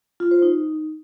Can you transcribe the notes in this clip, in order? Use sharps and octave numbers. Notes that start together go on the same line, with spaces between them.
F4
C5
D#4